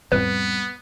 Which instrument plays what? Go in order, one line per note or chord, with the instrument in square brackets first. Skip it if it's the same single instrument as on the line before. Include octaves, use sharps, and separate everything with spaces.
[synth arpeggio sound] F2 A2 C3 [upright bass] G3 C4 [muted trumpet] B3 [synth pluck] B4